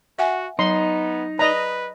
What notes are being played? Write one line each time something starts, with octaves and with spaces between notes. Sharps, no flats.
F#4 E5 F#5 G#5
F#3 B3 D#4 C6
B4 D5 D#5 A#5